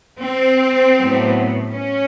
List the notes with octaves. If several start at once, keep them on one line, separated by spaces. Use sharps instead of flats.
C4
A2 F#3 B3
C#4